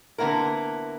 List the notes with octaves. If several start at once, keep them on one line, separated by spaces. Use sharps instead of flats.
D3 A#3 B3 E4 A#4